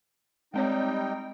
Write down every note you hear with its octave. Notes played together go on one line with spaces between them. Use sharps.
G3 G#3 C4 D#4 C#5 G5